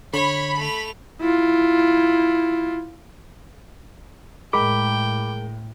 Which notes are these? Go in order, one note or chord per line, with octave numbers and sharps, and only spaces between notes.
D3 C#5 B5
A3 F7
E4 F4
A2 G#3 A#4 G5 B5 D6